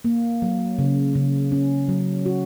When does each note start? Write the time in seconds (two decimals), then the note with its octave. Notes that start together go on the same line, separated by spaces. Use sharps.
0.05 A#3
0.42 F#3
0.79 C#3
1.15 C#3
1.52 C#4
1.89 F#3
2.26 F#4